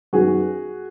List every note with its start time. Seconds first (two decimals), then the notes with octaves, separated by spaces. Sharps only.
0.13 F#2 D#3 F#3 B3 F#4 G#4